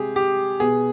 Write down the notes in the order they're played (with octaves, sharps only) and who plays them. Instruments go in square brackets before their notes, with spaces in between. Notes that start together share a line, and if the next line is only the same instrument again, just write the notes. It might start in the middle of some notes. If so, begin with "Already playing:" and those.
Already playing: [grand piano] C3 G#3 G4 G#4
G4
B2 B3 G#4